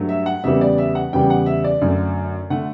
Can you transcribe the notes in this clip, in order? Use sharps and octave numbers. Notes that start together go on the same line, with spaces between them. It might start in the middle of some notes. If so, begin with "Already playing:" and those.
Already playing: G2 F#3 A3
E5
F#5
E2 C#3 G3 B3 E5
D5
E5
F#5
E2 C#3 G3 B3 G5
F#5
E5
D5
F#2 D3 A3
D3 A3 F#5